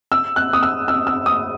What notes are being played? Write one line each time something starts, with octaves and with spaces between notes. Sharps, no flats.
E6
F#6
D#6
E6
E6
E6
D#6